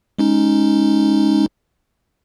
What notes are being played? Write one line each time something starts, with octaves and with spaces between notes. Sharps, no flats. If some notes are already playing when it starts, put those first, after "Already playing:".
G#3 C#4 D#4